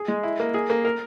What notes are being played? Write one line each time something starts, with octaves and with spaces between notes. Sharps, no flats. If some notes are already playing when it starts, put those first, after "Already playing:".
Already playing: G#4
G#3
E4
A#3
G#4
A#3
A#4